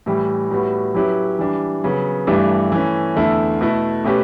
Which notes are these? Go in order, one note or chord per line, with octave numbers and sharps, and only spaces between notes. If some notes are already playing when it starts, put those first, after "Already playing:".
A2 E3 G3
A2 G3 B3 F#4
F#3 C#4 E4 G4 B4
E3 G3 D4
C#3 F#3 B3
G2 E3 A3 D4 G4
E3 A3 C#4
E2 D3 A3 E4 A4
B2 A3 E4 A4
B2 A3 C#4 G4 B4